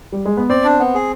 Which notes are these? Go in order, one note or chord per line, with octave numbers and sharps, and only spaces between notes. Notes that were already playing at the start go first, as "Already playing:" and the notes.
G3
G#3
B3
C4 D5
D4
B3
G#4